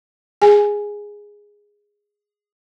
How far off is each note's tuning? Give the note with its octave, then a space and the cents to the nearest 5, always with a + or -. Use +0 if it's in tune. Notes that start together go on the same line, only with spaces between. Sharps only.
G#4 -10 G#5 +5